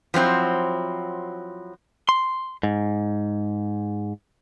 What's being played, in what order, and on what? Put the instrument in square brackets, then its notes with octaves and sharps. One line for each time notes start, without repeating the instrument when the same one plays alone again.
[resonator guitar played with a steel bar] F3 F#3 C4 E4
[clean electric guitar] C6
G#2